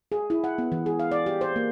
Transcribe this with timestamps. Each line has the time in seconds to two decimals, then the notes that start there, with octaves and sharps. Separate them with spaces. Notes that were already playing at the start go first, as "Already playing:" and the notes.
0.12 G#4
0.30 E4
0.44 F#5
0.58 B3
0.72 E3
0.86 G#4
0.99 F5
1.12 D5
1.26 G4
1.41 C5
1.56 A#3